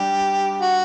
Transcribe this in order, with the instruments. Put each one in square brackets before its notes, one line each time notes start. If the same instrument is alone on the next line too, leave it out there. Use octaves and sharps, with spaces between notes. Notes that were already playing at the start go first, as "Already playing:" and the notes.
Already playing: [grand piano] G3 D4 [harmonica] G4
[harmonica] F#4